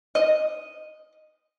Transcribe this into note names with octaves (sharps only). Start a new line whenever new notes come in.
D#5